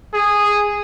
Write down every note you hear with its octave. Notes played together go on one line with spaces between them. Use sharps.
G#4